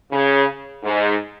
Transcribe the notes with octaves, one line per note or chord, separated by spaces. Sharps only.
C#3
G#2